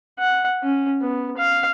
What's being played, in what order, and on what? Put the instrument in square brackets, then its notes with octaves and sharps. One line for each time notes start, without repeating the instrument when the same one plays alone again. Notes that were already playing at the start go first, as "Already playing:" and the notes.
[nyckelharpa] F#5
C#4
B3
F5